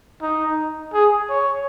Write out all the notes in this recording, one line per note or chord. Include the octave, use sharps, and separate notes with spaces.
D#4
G#4
C#5